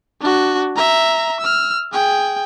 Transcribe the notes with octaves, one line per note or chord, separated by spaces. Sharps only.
D4 F#4
E5 A#5
E6 F6
G#4 G5